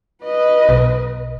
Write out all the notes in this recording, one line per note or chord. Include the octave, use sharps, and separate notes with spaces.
B4 D#5
B1